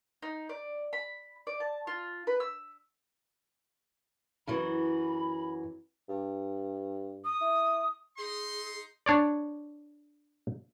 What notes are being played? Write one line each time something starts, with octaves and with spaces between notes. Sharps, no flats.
D#4
D5
B5
D5
A5
F4
B4
E6
F#2 E3 F#3 B5
G2
D#6
E4
D#4 G#4 C6
D4 C#5 D5